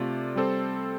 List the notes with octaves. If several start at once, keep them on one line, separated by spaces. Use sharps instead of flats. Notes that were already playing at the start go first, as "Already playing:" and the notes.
Already playing: C3 A3 F4 D5
G3 C4 A4 C5